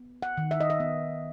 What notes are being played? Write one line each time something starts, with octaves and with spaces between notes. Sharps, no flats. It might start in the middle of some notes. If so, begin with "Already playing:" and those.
Already playing: B3
F#5
D#3
E5
D#5
E5
B3